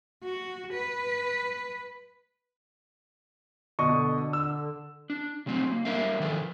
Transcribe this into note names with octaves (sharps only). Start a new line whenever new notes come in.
F#4
B4
B2 D3 D#5 C#6
E6
D4
C#3 F#3 A3 C4
A#3
G3 D4 A#4 E5 F5
D#3 F3 A4 B4